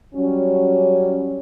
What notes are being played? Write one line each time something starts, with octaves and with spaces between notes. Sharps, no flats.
F#3 G3 C#4